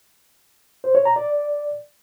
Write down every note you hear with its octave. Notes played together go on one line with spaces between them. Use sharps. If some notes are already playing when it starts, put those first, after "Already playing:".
C5
C#5
A#5
D5